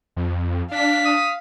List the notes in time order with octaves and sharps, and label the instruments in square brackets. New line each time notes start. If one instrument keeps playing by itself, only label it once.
[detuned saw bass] F2
[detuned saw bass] D4 [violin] F5 B6
[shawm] D#6